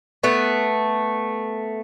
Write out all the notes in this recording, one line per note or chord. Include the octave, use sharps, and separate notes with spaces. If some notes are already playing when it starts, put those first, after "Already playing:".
A3 B3